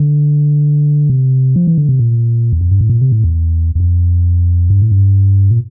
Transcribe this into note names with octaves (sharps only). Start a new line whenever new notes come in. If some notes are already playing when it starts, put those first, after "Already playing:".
Already playing: D3
C3
F3
E3
D3
C3
A#2
E2
F2
G2
A2
A#2
C3
A2
E2
E2
F2
G2
A2
G2
A#2